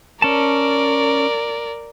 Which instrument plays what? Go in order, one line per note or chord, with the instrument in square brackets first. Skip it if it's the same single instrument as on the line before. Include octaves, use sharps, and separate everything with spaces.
[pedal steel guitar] C#4 A5 [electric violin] A#4 D5